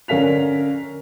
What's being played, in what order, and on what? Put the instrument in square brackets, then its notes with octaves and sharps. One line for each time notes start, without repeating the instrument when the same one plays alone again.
[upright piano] D3 C#4 A#4 F5 B6 F7